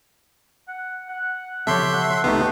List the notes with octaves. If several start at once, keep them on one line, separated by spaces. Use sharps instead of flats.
F#5
F#5
C#3 F3 B3 G4 A4 C#5 E5 C6
F#5
C2 A3 B3 D#4 G4